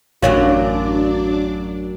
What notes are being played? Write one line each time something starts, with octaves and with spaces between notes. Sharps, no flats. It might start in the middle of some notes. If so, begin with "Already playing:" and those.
A1 F#2 F#3 D4 F#4 C#5 D5 F5